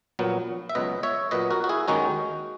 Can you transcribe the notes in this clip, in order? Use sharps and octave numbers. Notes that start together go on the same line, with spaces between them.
A#1 A#2 F#3 B3
E5
C#2 B2 F#3 B4 D#5
C#5 E5
A#2 F#3 B3 B4 D#5
F#4 A#4
F#4
E4 G#4
D#2 D#3 G#3 C#4 D#4 F#4